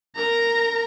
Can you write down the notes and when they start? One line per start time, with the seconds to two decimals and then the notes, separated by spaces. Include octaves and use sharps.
0.16 A#4 A#5